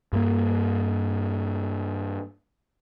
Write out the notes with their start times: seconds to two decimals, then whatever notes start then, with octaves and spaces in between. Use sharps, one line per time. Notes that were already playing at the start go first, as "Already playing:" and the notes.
0.13 G2 A#3